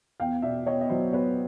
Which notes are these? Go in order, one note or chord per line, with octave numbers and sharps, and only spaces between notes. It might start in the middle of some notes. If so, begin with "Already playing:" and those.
E2 F5 G5
B2 D5 E5
B3 C#5 D#5
D#5
F#3 C5 D5
B3 B4 C#5